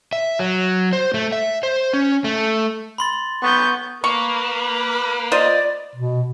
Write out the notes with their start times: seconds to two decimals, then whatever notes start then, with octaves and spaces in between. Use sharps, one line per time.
0.13 E5
0.39 F#3
0.93 C5
1.14 A3
1.32 E5
1.63 C5
1.93 C#4
2.24 A3
2.98 B5 C6 A6
3.43 B3 C#6 G6
4.04 A#3 B4 B5 C#6
5.32 F4 C5 D5 D#5
5.96 B2